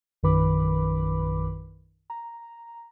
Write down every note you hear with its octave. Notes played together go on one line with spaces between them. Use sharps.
A#1 F#2 D#3 B4 B5 D6
A#5